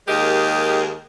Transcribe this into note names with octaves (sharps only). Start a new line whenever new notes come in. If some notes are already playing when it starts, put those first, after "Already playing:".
D#2 G#3 G4 G#4 A#4 D#5